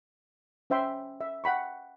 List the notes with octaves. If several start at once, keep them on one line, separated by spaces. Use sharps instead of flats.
C#4 C5 E5 G5 C6
E5
F#5 G5 B5 C#6